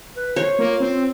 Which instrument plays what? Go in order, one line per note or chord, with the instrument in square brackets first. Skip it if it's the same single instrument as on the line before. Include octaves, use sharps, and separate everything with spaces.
[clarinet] B4
[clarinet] C5 [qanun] C#5
[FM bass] A#3 [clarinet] F4
[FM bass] C4